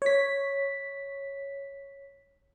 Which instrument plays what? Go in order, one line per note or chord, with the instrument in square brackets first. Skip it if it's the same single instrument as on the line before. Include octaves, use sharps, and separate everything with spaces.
[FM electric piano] C#5 B6